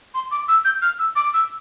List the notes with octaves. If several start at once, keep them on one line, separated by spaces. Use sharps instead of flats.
C6
D6
E6
G6
F6
E6
D6
E6